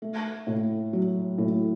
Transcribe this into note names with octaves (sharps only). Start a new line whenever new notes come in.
A3
A2
F#3
A2